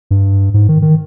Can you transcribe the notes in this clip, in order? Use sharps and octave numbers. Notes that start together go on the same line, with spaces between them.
G2
G#2
D#3
D#3